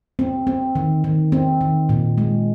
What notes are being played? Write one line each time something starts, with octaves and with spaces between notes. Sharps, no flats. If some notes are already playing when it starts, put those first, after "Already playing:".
C4
C4
D#3
D#3
C4
D#3
A#2
G#3